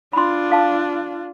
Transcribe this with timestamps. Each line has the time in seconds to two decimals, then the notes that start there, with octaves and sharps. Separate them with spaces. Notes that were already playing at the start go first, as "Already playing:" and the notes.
0.13 D4 F4 B5 C6
0.50 A4 F5 A5